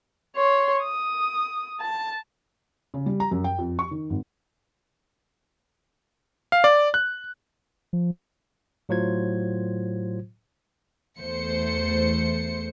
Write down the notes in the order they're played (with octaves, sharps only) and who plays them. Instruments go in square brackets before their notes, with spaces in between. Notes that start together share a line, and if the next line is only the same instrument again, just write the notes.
[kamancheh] C#5 C6
D#6
A5
[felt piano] C#3
G3
A#5
F#2
G5
F2
C#6
D#3
G#1
[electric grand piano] F5
D5
F#6
[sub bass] F3
[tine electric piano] A2 F#3 F4 C5 G#6
[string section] E2 A3 C5 C#7